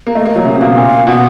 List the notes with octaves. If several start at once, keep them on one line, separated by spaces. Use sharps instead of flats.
A#3
A3 D#5
A#3
F#3 D#5
C#3 E5
C3
B2 F5
A#2
B2 F#5